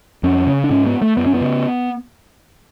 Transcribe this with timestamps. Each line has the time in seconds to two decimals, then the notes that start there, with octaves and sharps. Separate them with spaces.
0.23 F2 C#4
0.47 C#3
0.64 D4
0.70 G#2 C#4
0.86 B3
1.02 A3
1.17 F#2 B3
1.26 C#4
1.34 B3
1.41 C#3